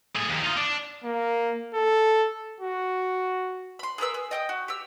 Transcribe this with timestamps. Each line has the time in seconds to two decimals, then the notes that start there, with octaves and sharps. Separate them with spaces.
0.16 A2 G#4
0.29 D#2 D#3
0.42 D#4 F4
0.57 D4
1.04 A#3
1.74 A4
2.60 F#4
3.79 B5 C6
3.98 G#4 A#4 B4 E6
4.14 G#4
4.31 D#5 G5 D#6
4.49 F#4
4.68 G4 E6